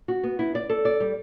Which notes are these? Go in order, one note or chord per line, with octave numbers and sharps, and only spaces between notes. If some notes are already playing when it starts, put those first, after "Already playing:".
F#4
B3
E4
D5
A4
D5
G3